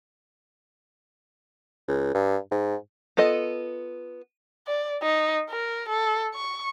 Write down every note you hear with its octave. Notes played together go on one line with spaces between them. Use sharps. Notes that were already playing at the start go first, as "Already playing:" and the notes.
C#2
G2
G#2
B3 F4 A4 D#5
D5
D#4
A#4
A4
C#6